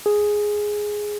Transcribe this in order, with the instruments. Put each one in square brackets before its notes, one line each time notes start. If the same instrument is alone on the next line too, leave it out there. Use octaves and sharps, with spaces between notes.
[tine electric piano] G#4